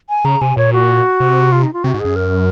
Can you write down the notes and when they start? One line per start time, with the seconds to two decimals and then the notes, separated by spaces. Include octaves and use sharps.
0.09 G#5
0.25 C#3 A#5
0.41 C3 G#5
0.57 A#2 C#5
0.73 F#4
1.20 C3
1.52 F4
1.63 D#4
1.73 F4
1.83 C3 F#4
1.94 G#2
2.00 G#4
2.05 F#2
2.16 A#4